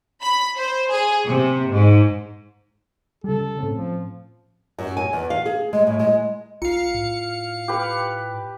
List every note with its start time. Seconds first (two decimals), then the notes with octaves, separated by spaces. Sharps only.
0.22 B5
0.56 C5
0.91 G#4
1.26 C3
1.71 G#2
3.24 C#3 G3 A4
3.58 A2 C4 C#4
3.75 F3
4.79 F#2
4.97 G#5
5.13 E2
5.30 F5
5.46 G#4
5.73 G#3
5.87 A2
5.99 G#3
6.62 B1 F4 F5 C#7
6.94 A2
7.68 G4 B4